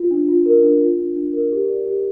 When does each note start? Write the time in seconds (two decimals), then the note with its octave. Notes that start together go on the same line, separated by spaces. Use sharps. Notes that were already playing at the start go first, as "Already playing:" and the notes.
Already playing: F4
0.11 D4
0.28 F4
0.46 A#4
0.63 D4
0.81 F4
0.99 D4
1.16 D4
1.33 A#4
1.52 G4
1.69 D5
1.86 G4